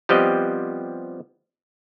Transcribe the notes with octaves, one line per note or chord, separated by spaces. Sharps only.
F3 G3 B3 C4 G4 D#5